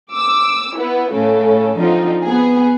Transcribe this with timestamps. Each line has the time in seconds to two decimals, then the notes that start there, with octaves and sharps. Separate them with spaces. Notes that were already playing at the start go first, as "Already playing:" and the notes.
0.13 D6 E6
0.76 B3 E4
1.13 A2 C#3 A4
1.79 D3 F3 C4 D#4 F4
2.24 B3 G#4